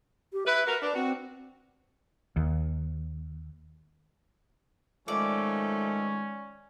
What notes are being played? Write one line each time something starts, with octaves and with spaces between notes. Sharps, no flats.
G4
E4 B4 E5
F#4 A#4 B4
D4 B4
C4 F#4
D#2
D#3 F3 G#3 A3 C#4 D5